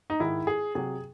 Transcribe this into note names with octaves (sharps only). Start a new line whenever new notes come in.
D#4
G#2 D#3 G#3 E4
G#4
C3 F#3 G#4